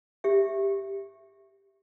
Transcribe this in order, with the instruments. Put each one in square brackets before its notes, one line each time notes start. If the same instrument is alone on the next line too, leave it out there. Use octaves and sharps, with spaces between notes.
[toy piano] G4 E5